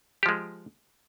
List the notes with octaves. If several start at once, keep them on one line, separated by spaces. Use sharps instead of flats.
F3 G#3 G4